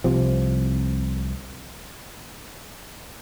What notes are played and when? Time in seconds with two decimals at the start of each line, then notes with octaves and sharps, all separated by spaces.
0.04 C2 C3 F3